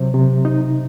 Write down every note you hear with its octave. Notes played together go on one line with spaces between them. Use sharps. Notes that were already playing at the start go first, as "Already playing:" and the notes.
Already playing: C3 F#3 C5
C3
D#4